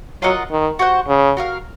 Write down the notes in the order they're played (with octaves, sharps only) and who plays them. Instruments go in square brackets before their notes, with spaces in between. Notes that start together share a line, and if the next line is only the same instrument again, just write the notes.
[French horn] F#3 [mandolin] F4 A#4 D#5 F#5
[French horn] D#3
[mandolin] F#4 C5 F#5
[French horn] C#3
[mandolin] F#4 A#4 F5